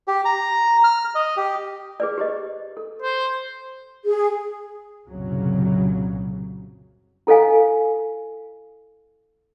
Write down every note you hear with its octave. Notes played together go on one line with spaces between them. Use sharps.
G4
A#5
F6
D#5
G4
G#4 B4 D5
G4 C5 D#5
A4
C5
G#4
C2 F#2 A#2 C#3 F#3
E4 A4 D#5 F5 G#5